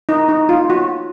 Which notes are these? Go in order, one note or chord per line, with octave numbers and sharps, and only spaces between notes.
D#4
D#4
F4
F#4